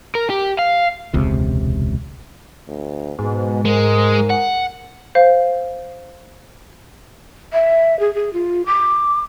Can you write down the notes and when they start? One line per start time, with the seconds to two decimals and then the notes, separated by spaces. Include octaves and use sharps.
0.15 A#4
0.30 G4
0.59 F5
1.14 E1 C#2 C3
2.68 D2
3.19 G#2 B2
3.65 G#3 A#4
4.30 F#5
5.15 C5 F5
7.53 E5
8.00 G#4
8.15 G#4
8.33 F4
8.66 D6